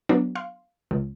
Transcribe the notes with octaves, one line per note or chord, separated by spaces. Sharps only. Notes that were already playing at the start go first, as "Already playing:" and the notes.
F#3 B3 D4
F5 C6
C#2